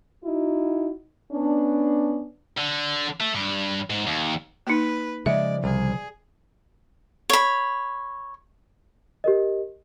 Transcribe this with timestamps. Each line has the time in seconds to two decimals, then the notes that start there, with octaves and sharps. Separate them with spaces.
0.24 D#4 E4 F#4
1.32 B3 C#4 D4
2.57 D3
3.20 A3
3.35 G2
3.90 G#2
4.07 D#2
4.67 A#3 D#4 B4
5.26 C#3 F3 G#3 D5 E5
5.64 C2 G#4
7.30 C#5 B5
9.24 G4 A#4 D#5